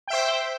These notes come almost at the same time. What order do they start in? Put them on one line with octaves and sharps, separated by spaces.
G5 E5 C5